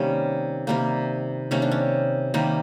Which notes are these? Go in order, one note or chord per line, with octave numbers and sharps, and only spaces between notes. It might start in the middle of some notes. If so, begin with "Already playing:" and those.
Already playing: C3 D#3 G3 A#3 C#4
C3 D#3 G3 A#3
C3 D#3 G3 A#3 C#4
D4
C#4
C3 D#3 G3 A#3